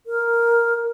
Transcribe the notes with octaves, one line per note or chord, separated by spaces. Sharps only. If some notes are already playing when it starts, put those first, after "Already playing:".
A#4